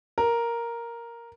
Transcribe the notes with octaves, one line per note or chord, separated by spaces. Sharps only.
A#4